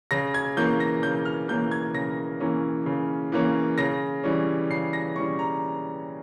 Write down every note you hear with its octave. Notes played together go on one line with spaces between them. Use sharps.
C#3 A#6
G#6
E3 A#3 C#4 G6
A#6
C#3 G6
F6
E3 A#3 C#4 G6
G#6
C#3 A#6
E3 A#3 C#4
C#3
E3 A#3 C#4
C#3 A#6
E3 G3 C#4
C#3 C7
A#6
E3 G3 C#4 C#6
A#5